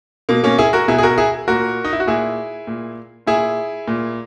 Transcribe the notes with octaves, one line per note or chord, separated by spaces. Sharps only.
B2 A#3
A#3 C#4
E4 G#4
F#4 A#4
B2 E4 G#4
G#4
F#4 A#4
E4 G#4
A#2 F#4 A#4
D#4
E4
F#4
A#2 E4 G#4
A#2
A#2 E4 G#4
A#2